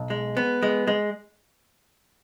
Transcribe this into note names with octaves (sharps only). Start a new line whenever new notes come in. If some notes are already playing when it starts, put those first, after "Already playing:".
Already playing: B1
G#3
B3
G#3
G#3